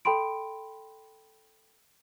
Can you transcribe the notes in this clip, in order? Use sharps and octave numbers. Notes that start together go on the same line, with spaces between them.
A4 G5 B5 C6 D7